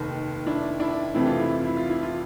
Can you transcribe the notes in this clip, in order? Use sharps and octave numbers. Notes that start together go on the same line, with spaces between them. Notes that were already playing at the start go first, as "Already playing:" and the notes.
Already playing: F1 D#2 D#3
D4 E4
D4 E4
F2 C3 E3 A3 C4 E4
F4
E4
F4
E4
F4
E4
F4